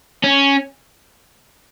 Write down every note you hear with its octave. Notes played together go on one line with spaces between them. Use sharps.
C#4